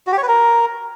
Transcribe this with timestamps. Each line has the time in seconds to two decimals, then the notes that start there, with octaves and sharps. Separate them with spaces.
0.07 F#4
0.12 G4
0.18 C#5
0.23 B4
0.28 A#4